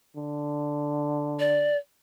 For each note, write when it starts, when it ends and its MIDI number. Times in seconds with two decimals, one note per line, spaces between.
0.16 1.73 50
1.40 1.77 74